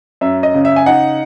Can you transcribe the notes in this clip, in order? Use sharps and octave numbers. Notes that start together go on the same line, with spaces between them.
F#2 E5
D#5
C#3
E5
G#5
D#4 F#5